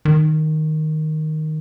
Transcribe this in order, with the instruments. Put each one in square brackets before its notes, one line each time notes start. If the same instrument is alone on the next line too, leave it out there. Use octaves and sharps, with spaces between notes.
[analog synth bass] D#3